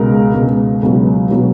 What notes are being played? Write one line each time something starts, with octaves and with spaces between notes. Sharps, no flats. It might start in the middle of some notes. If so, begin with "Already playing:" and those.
Already playing: C#2 B2 G#3 A#4
C#2 B2 G#3
C#2 B2 F#3
B2 F#3